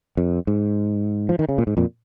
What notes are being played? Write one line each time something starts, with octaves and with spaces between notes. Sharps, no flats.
F2
G#2
F3
D#3
C#3
A#2
G#2
F2 A#2